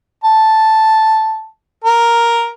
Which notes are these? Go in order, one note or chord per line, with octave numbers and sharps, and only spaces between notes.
A5
A#4